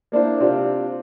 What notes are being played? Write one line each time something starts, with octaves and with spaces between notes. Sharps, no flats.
A#3 D4 E4 C5
C3 C4 D4 F4 D5